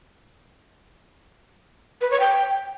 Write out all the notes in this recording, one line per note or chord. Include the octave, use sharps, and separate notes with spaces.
B4
C#5
G5